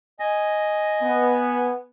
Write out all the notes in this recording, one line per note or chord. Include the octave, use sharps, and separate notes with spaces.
D#5 G#5
B3